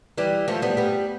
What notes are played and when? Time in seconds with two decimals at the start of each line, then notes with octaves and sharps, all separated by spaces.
0.18 E3 G3
0.48 F3 A3
0.62 G3 B3
0.77 G3 B3